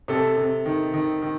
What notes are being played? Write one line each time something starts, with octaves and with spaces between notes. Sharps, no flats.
C3 A4
C3
D#3
D#3
D#3